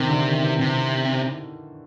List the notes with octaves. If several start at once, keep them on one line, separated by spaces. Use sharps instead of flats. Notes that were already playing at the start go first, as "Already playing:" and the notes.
Already playing: C3 D#3
D3
D#3
E3
C3